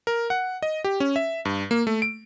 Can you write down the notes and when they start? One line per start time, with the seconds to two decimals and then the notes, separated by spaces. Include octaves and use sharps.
0.07 A#4
0.30 F#5
0.62 D#5
0.84 G4
1.00 C#4
1.16 E5
1.45 G2
1.71 A#3
1.87 A3
2.02 D7